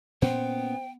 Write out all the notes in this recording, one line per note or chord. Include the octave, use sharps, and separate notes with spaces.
A#2 B3 C#4 C5 G5